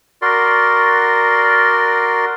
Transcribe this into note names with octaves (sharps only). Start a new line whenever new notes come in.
F#4 A#4 D5 C6